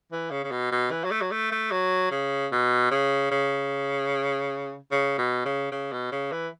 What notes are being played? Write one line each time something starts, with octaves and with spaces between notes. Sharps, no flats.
E3
C#3
C#3
B2
B2
E3
F#3
A3
F#3
A3
A3
F#3
C#3
B2
C#3
C#3
C#3
B2
C#3
C#3
B2
C#3
E3